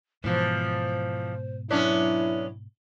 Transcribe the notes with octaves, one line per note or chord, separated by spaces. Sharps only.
G#2 B2 E3 F3 C5
F#3 B3 C#4 D4 E4